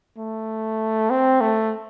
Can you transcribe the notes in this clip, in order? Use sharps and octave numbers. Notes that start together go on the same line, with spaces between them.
A3
C4
A3